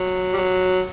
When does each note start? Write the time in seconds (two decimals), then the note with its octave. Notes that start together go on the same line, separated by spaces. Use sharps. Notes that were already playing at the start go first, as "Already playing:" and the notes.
Already playing: F#3
0.33 G3
0.37 F#3